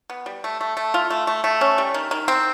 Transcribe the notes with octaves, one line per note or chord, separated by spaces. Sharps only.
B3
G3
A3
A3
A3
F4
A3
A3
A3
C#4
G3
D#3
D#3
C4